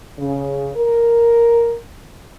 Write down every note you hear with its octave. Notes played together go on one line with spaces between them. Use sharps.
C#3
A#4